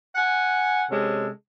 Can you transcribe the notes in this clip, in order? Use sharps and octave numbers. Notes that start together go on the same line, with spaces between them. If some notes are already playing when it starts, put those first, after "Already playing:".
F#5 G#5
C3 G#3 C#4 A4